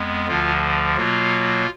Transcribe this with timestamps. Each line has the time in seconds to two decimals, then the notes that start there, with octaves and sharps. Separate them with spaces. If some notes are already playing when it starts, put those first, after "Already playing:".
Already playing: F2 G#3 B3
0.28 D2 D3 F3 F4
0.97 B2 F#3 A#3 F4